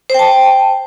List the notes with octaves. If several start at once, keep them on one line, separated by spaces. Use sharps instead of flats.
C5 G5 A5